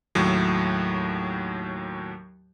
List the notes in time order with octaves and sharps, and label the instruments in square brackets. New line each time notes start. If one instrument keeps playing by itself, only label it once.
[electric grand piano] D#2 A2 F#3